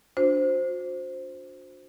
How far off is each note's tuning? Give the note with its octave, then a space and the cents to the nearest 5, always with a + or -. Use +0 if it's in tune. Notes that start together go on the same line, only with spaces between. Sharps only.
D4 +0 F#4 -35 C5 +0